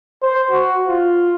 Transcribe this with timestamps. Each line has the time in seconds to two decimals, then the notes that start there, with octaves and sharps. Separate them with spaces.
0.22 C5
0.51 F#4
0.88 F4